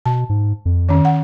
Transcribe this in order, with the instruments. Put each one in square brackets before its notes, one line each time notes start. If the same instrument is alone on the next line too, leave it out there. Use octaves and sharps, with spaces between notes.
[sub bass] B2 [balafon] A5
[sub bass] G#2
F2
[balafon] D#3 C#4
F#5